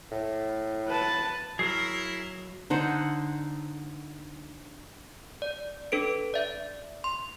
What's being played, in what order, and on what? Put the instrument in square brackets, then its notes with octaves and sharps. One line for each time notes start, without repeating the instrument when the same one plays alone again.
[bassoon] A2
[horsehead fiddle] B4 A5
[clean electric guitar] F#3 [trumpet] E4 [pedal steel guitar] G#4 A#4 [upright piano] C7
[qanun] D3 D#4 C5 F#5
[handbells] D5
D4 A4 B4 D7
D5 E5
C6